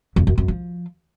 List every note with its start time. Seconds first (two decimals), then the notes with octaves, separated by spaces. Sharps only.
0.16 F2
0.27 F#2
0.38 F#2
0.48 F3